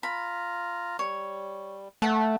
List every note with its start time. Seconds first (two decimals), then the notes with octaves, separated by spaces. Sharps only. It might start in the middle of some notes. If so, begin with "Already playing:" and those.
0.03 F4 A#5 B5
0.99 G3 C#5
2.02 A3 F#5 A5